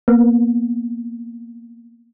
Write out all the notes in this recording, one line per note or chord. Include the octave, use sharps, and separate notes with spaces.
A#3 B3